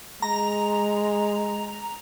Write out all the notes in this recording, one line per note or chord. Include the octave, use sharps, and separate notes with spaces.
G#3 A#5